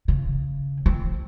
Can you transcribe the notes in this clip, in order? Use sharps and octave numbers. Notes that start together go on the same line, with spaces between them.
C#3
C4